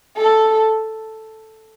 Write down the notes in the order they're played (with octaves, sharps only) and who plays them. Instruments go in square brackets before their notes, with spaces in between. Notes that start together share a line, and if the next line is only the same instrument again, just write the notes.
[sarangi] A4